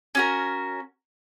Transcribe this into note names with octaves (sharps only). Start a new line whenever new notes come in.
C#4 F#4 A#4